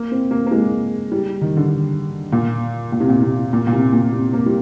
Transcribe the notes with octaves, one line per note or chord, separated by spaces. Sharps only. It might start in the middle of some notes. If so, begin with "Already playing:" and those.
Already playing: A#3
C4
A#3
A#3
G#3
G3
D#3
D3
A#2
A#2
C3
A#2
C3
A#2
A#2
C3
A#2
C3
A#3
G3